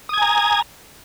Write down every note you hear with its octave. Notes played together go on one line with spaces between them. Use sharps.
G#5 A#5 D#6 G#6